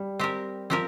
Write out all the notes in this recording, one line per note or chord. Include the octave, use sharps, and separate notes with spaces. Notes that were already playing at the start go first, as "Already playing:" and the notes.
Already playing: G3
C4 G4 A#4
F3 C4 G4 A#4